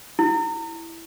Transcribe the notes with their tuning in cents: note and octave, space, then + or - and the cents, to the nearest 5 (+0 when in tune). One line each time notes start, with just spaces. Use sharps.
E4 +5